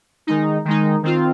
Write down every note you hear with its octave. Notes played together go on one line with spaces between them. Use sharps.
D#3 G#3 D#4
D#3 G#3 D#4
D#3 C4 F4